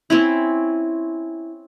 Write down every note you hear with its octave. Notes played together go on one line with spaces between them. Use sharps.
C4 C#4 E4